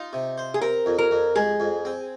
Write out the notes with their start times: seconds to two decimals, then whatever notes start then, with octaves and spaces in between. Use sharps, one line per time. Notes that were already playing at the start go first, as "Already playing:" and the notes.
Already playing: D#4 F4
0.13 C3
0.38 C5
0.54 G#4
0.61 C4 A#4
0.86 F2
0.98 A#4
1.11 F2
1.36 G#3 G#4
1.60 F2
1.85 C4